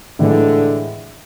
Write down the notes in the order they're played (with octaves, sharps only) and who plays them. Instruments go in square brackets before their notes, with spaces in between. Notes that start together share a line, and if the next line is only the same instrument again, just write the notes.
[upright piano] A2 E3 G#3 [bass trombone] D3